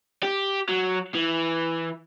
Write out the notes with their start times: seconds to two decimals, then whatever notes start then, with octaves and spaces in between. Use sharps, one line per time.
0.23 G4
0.69 F#3
1.15 E3